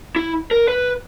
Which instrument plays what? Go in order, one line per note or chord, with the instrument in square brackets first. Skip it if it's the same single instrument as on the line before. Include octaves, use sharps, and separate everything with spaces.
[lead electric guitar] E4
A#4
B4